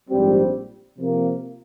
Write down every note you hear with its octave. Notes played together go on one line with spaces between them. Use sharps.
A#1 G#2 G3 C4 G4
C3 F3 A#3